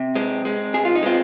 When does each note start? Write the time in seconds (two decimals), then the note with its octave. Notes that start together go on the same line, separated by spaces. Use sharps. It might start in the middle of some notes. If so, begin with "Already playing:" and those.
Already playing: C3
0.15 G#3 C4
0.45 G#3
0.74 C3 G#4
0.85 F4
0.95 D#4
1.03 G#3 C4 F4